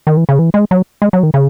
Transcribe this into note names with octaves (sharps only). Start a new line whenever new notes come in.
D#3
E3
C#3
E3
G#3
F#3
G#3
F#3
D#3
C#3